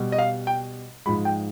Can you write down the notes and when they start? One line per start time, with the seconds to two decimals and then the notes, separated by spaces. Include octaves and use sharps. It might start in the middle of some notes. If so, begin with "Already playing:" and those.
Already playing: B2 G3
0.12 D#5
0.18 F5
0.47 G5
1.06 G#2 F3 G#3 B5
1.25 G5